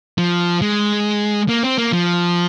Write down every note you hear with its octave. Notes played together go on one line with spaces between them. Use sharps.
F3
G#3
A#3
C4
A#3
F3